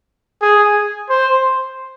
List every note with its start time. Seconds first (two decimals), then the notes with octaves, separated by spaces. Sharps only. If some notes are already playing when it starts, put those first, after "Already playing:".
0.42 G#4
1.09 C5